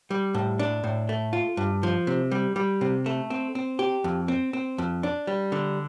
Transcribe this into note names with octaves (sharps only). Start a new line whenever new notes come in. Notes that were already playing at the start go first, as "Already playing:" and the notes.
G3
A2
D4
A2
A3
F4
G2
F3
C3
G3
G3
C3
A3
C4
C4
G4
F2
C4
C4
F2
D4
G3
D3